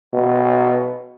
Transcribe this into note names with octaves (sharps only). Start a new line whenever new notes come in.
B2